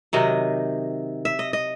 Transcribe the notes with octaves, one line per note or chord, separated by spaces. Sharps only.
C3 D#3 F#3 D#5
E5
D#5
D#5